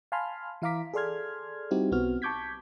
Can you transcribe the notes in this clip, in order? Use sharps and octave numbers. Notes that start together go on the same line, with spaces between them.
F5 G#5 A5 B5 C6 F6
E3 E4 F5 A#5 D6 B6
G#4 A4 D5 C6 F6 G#6
G3 C4 D#4 E4 F#4 G4
B1 B3 C4 F#4 F6
A5 C#6 D6 G6 G#6 B6